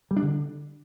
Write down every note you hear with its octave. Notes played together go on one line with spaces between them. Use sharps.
G3
D4
D3